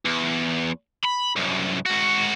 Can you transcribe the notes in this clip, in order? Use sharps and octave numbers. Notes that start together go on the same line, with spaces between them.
E2
B5
C2 F#2
G#2 F#4